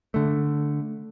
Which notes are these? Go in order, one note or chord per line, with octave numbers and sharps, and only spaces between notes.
D3 A3